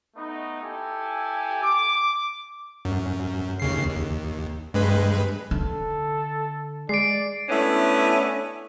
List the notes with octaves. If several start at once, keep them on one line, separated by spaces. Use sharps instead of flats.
A3 B3 D#4
E4 G4 A4 G#5
D6
F#2
D#2 C#3 C7
D#2
G2 G#3 B4
D3 A4
G#3 D5 C7 D7
A3 B3 C#4 D4 E4